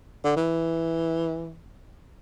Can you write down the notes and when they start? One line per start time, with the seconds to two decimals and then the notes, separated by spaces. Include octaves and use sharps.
0.24 D3
0.36 E3